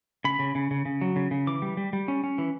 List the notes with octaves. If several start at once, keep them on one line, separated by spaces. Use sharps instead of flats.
C#3 B5
C#3
C#3
C#3
C#3
F#3
C#3
C#3
E3 D6
G3
G3
G3
C#4
C#4
E3